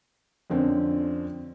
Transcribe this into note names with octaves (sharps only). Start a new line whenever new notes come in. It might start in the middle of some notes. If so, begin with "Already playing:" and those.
F2 D3 C4 C#4